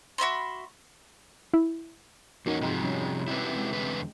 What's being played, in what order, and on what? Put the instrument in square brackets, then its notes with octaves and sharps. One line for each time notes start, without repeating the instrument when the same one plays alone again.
[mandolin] F#4 E5 B5 C6
[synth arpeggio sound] E4
[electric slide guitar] E2 C#4 [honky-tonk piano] A#3 [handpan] D#4 F#4
[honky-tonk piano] F2 G#2 [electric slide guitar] C3 F3
[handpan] G3 C#4
[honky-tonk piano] C3 [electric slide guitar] E4 F#4 B4
[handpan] G#3
[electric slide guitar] E2 D3 B4